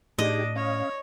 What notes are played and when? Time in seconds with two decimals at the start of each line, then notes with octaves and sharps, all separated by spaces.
0.18 A2 D4 D#4 G4 G#4 D#5
0.56 C#4 C#5 F5